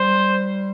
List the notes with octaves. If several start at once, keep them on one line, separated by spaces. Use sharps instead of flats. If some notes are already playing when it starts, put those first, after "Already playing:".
Already playing: G3 C5